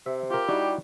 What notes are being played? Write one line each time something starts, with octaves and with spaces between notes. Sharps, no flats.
C3 E5
F4 G4 A#4
G3 D#4 E4 F#4